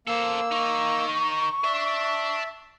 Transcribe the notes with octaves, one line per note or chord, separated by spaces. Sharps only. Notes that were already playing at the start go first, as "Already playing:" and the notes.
A#3 A4 C5 E6
D#4 A#4 C#6
D5 E5 A5